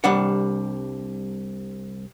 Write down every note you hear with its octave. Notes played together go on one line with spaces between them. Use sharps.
C2 G3 D4 F#5